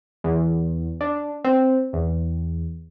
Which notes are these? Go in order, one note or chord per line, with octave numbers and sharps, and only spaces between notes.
E2
D4
C4
E2